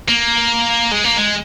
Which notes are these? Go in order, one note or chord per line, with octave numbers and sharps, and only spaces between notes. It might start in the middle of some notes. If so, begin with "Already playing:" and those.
A#3
G#3
A#3
G#3